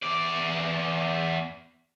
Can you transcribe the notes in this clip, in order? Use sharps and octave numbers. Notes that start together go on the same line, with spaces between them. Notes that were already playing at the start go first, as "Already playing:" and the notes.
E2 D5